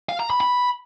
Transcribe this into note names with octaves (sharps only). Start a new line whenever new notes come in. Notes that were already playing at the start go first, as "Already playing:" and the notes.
F5
A#5
B5
B5